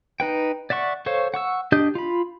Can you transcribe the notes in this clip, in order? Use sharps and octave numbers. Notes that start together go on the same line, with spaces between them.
D#4 B4 G5
D5 E5 F#5 C#6
A4 C5 C#5 F5 C#6
F#5 C#6 E6
D4 G4 D#5 D#6 G6
F4 B5